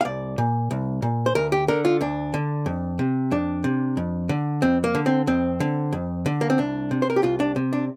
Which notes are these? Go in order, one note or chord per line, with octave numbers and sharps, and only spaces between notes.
F5
C2 D5
A#2
C2
A#2
C5
D2 A#4
G4
D3 A#4
F4
D2 D4
D3
F2
C3
F2 D4
C3
F2
D3
F2 C4
A#3
D3
C4
F2 C4
D3
F2
D3
A#3
C4
C2 D4
C3
C5
A#4
G4
C2 F4
D4
C3
D4